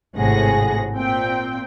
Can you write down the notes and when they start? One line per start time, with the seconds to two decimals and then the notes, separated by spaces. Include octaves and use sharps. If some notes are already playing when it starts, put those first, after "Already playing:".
0.15 G#1 A2 C3 G#4 F#5 A#6
0.94 A#2 C4 G5